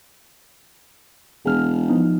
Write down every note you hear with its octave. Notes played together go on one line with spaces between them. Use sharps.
E1 G#4 F6
F3 B3 D#4